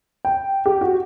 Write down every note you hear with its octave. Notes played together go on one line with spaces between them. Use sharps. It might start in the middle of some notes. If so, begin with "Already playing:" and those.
G5
G4
F#4